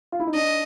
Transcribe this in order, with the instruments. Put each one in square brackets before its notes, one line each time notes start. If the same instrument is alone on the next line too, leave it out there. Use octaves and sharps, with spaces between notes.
[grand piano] F4
E4
D#4
[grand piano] D4 [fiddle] D#5